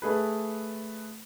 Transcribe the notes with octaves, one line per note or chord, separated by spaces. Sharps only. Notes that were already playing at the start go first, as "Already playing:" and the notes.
A3 G#4 B4